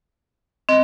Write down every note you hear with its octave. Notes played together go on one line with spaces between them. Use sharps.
C4 D#5